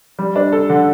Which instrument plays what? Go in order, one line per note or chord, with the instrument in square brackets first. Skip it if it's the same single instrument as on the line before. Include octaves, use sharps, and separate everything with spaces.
[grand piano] G3
D4
A4
D3